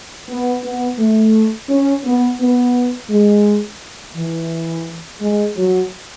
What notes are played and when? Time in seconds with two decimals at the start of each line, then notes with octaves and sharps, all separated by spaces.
0.28 B3
0.63 B3
0.98 A3
1.69 C#4
2.04 B3
2.40 B3
3.09 G#3
4.16 E3
5.20 G#3
5.56 F#3